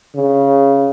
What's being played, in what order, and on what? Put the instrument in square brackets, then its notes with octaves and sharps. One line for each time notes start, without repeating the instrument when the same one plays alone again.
[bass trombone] C#3